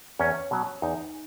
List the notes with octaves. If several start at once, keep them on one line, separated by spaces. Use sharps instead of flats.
E2 C#4
B2 F#3
E2 D#4